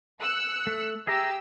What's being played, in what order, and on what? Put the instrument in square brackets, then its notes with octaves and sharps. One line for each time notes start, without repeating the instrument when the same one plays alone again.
[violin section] E6 F#6 C#7
[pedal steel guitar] A3
[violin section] G4 E6 [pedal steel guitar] G#4 E5 A#5